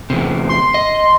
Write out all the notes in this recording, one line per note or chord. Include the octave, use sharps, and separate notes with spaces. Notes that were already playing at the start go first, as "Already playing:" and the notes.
E2 C3
C6
D#5